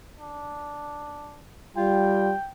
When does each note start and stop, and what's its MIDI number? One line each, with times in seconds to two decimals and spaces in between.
0.20 1.43 62
1.77 2.34 55
1.77 2.32 65
1.77 2.52 79